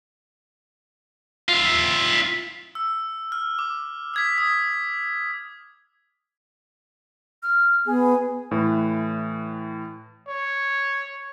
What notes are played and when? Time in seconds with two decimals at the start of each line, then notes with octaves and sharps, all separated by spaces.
1.49 F4 E5
2.75 E6
3.32 F6
3.59 D6
4.14 D#6 G#6 B6
4.38 D#6
7.43 F6
7.86 B3 G#4
8.51 A2 E3
10.28 C#5